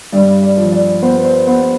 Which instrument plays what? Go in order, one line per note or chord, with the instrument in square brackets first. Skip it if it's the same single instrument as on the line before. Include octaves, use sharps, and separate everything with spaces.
[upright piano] G2 D5
D5
F3
D5
B3 C5
B4
C5
B3 C5